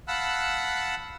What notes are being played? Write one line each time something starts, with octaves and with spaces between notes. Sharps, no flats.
F5 F#5 A5 B5 E6 F#6